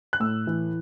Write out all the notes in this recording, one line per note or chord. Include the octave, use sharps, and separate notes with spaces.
F#6
A2 E6
E3